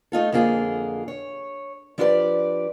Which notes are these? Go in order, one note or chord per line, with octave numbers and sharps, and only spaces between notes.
A3 D#4 F4 A4
F2 D3 A#3 F4 G#4
C#5
F3 D4 E4 G4 B4 D5